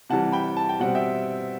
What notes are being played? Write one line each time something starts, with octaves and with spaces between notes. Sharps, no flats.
C3 E3 G3 F#5 A5
G5 B5
A5
G5
B2 G3 C4 F#5
E5 G5